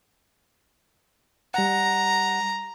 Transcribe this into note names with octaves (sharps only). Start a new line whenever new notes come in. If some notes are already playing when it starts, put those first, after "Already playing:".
G3 F#5 A#5